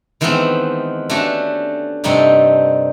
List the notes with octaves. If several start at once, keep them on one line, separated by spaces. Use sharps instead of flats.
D#3 E3 G#3 A3 B3 C4
A3 C#4 D4 F#4 G4
G2 C3 G3 A3 D#4 G4